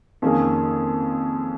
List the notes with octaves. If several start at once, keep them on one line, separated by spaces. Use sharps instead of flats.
F2 D#3 A#3 C#4 G#4